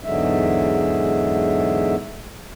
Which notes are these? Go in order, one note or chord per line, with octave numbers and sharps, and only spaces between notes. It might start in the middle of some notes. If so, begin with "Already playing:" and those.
E2 G#2 D3 F#3 G#3 E5